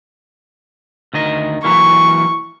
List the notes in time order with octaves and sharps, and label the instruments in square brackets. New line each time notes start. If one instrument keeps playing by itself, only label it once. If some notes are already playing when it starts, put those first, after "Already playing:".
[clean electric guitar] D2 D#3 D#5
[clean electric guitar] E3 F#3 A#3 [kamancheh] C#6